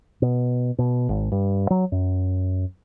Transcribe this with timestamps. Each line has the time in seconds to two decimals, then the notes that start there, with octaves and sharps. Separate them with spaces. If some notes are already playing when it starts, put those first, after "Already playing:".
0.22 B2
0.78 B2
1.09 G#1
1.32 G2
1.70 F#3
1.92 F#2